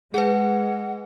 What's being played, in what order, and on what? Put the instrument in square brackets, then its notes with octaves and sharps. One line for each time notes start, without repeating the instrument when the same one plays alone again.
[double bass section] G#3 [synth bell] G#4 B4 [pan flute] F#5